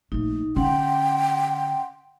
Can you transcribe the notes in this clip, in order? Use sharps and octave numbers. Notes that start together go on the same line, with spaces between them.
A#1 A3 D#4
D3 C#4 F#5 G5 C6